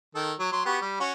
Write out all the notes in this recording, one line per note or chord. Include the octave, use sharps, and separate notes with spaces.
D#3 A4
F#3
F#3 C6
B3 F#4 G4
G3
C#4 F#4